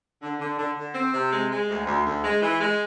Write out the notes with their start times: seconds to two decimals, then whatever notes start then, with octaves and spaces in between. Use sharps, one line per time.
0.22 D3
0.40 D3
0.59 D3
0.76 D3
0.95 C4
1.14 C3
1.33 G#3
1.51 G#3
1.69 D2
1.87 D2
2.06 D2
2.24 G#3
2.42 E3
2.61 G#3